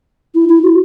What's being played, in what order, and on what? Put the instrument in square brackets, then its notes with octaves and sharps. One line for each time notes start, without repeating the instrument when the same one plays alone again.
[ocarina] E4
E4
F#4